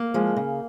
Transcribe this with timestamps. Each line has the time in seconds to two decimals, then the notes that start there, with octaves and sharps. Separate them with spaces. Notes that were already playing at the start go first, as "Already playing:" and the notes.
Already playing: A#3
0.14 F3 G#3
0.36 C#3